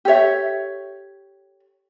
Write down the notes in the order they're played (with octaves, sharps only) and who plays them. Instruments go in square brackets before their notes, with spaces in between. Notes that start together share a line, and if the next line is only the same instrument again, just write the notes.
[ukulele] G4 A4 C#5 E5